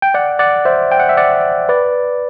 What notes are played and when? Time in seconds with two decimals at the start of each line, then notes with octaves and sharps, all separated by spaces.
0.02 G5
0.14 D5 F#5
0.39 D5 F#5
0.65 C5 E5
0.92 G5
1.00 F#5
1.09 E5
1.17 D5 F#5
1.69 B4 D5